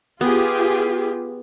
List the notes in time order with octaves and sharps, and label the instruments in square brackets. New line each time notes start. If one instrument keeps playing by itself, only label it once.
[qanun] B3 [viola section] F4 G4 G#4